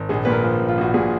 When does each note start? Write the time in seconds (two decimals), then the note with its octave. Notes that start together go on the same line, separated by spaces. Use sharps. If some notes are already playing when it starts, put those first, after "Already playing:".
Already playing: G#1
0.09 A#1 G#4
0.25 A#2 B4
0.32 A#4
0.44 F3
0.60 A#1
0.68 F4
0.78 A#1 F#4
0.94 A#2 G#4